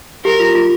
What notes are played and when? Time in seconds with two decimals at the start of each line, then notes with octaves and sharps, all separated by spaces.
0.25 G4 A#4
0.40 F4
0.55 F4